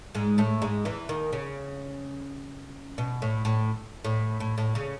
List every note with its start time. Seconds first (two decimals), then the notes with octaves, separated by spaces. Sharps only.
0.15 G#2 G#3
0.38 A2 A3
0.62 G#2 G#3
0.85 E2 E3
1.09 D#2 D#3
1.33 C#3
2.98 B2
3.22 A2
3.45 A2
4.04 A2
4.40 A2
4.58 A2
4.75 C#3